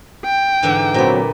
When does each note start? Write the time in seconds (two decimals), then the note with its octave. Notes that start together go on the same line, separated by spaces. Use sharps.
0.25 G5
0.63 G#2 D3 E3
0.94 A#2 F#3 B3 C4